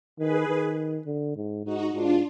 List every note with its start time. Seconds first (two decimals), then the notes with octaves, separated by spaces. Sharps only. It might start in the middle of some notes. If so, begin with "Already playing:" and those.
0.19 D#3 G#4 B4
0.48 D#3
1.06 D3
1.36 G#2
1.65 G#2 D#4 F#4
1.93 G#2 D4 F4